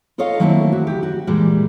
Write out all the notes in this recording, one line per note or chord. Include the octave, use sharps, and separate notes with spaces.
F4 A4 A#4 C#5 D#5 F5
D#3 F#3 A3 A#3 C4 E4
F#4
D2 G4
F#4
A#2 E3 G3 G#3